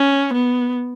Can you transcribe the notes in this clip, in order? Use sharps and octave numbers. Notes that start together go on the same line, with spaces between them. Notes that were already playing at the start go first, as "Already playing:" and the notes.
Already playing: C#4
B3